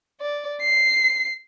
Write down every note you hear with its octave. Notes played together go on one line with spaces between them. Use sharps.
D5
C7